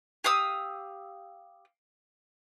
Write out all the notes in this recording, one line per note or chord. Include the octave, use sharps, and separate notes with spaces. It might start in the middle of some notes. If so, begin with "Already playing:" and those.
G4 F5 D#6 E6